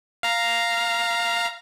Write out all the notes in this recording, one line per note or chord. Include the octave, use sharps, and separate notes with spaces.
F5 A#5